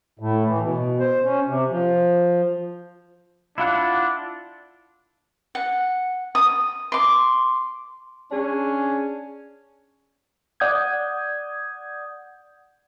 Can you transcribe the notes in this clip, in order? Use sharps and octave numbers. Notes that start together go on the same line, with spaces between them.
A2
E3
B2
C5
C#4
C3
F3
D4 E4 F4 F#5
F#5
D#6
C6 D6
C#4 D4 G#4
D5 F#5 D#6 G6 G#6